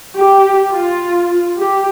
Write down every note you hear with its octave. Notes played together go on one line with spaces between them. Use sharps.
G4
F4
G4